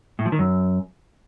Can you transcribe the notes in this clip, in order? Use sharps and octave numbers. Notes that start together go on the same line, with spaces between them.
A2
F3
D#3
F#2